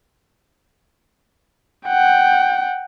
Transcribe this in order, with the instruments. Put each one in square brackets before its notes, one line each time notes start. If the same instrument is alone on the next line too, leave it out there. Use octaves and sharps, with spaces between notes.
[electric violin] F#5 G5